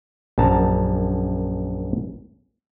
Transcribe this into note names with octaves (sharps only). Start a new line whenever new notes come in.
A#1 F#2 A5 A#5